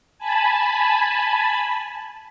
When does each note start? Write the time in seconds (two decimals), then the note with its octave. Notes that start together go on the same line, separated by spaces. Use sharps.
0.18 G#5 A5 B5